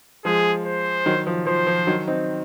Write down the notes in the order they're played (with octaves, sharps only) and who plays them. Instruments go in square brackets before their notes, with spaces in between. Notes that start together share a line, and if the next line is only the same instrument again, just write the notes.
[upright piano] F3 G#3 [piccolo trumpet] G#4
[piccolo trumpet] C5
[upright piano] D#3 F#3
F3
[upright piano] F3 [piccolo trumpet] C5
[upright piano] F3
D#3 F#3
C4 D#4